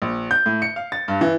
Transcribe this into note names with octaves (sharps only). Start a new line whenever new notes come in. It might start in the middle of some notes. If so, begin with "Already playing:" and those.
A#1
G6
A2
C#7
F5
A6
G2
E3